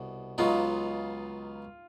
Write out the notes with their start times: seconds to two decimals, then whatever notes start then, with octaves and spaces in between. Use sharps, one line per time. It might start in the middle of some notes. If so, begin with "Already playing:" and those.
Already playing: C2 B2
0.38 C#2 C#3 F#3 B3 D#4 F4